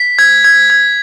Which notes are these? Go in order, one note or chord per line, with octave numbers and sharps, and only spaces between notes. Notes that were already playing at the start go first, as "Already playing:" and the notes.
Already playing: B6
G#6
G#6
G#6